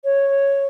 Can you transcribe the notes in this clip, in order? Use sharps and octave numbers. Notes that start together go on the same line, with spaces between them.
C#5